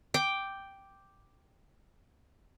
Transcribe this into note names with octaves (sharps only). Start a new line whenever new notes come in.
G5 D6